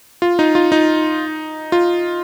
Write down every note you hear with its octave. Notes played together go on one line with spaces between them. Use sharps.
F4
D#4
F4
D#4
F4